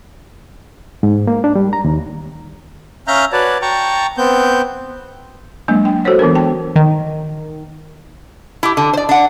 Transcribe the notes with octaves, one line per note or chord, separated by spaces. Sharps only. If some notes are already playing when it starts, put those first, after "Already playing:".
G#2
A#3
D4
G3
A#5
D#2
C#4 E5 F5 A#5 F6 G6
F#4 B4 C#5 D5 A5
G5 A5 A#5 C#6
B3 C4 G6
F#3 G#3 A#3 D4
D4 G5
F#4 A4 C5 C#5 F#5
E3 B3 D4 A#4
D4 G5 A5
D#3
E4 G4
D3
C5 D5
D4 F#5